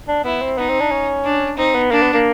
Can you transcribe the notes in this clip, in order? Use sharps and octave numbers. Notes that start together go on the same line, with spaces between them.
D4
B3 E4
C4
B3 D#4
C4
D4
C#4
D4
C4 D#4
B3
A#3 D4
B3
A#3